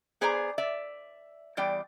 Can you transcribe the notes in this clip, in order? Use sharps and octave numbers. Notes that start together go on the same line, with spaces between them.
B3 G#4 C5 D5 G#5 A#5
D5 E5
E2 G3 D5 G5